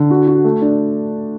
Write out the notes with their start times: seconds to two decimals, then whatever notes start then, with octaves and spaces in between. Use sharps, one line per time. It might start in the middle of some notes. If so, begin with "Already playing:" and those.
Already playing: D3
0.10 F#4
0.27 F#4
0.44 A3
0.62 D4